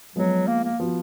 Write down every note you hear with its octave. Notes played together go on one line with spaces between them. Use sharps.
F3 F#3 G#3 B3
A#3
A#3
F3 B3 F#4